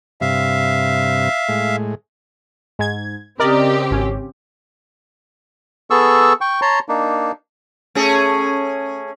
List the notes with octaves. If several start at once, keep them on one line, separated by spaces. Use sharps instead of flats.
G2 C3 E5 F5
A2 G#3
G#2 G#6
C#3 C4 G4 A#4 D5 D#5
G#1 C#4
B3 G#4 A4 C#6 E6
G5 C#6
C#5 A5 A#5 C6
A#3 D4 D#4
A3 C#4 G#4